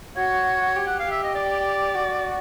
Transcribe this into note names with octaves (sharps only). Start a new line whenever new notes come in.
F#4 C#5
G4
F#5
F5
G4
E5
D#5
D5
F#4